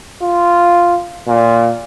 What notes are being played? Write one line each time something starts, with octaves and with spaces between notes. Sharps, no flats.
F4
A#2